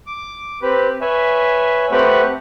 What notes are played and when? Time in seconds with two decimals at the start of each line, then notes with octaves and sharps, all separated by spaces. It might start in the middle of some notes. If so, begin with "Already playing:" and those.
0.07 D6
0.62 C4 G4 B4
1.01 B4 C#5 E5 G#5
1.91 A3 C4 G4 B4 F#5 C#6